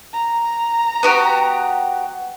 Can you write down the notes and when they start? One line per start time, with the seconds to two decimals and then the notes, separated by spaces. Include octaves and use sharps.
0.13 A#5
1.03 B3 F#4 G4